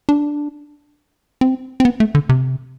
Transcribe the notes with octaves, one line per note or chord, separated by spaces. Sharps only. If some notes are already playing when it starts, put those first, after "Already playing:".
D4
C4
C4
B3
A3
D3
C3